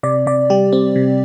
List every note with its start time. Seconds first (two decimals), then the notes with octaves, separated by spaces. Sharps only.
0.03 C3 D5
0.26 C3 D5
0.50 G3 G4
0.73 C4
0.96 C3